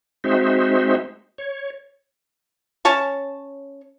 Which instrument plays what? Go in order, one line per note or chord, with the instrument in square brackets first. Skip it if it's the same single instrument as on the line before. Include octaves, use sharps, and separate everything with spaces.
[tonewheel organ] G#3 C4 D#4 F#4 C5 E5
C#5
[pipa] C#4 C#5 A5 C#6